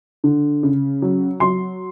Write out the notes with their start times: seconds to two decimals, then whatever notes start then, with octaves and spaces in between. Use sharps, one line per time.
0.24 D3
0.63 C#3
1.02 F#3
1.40 F#3 C6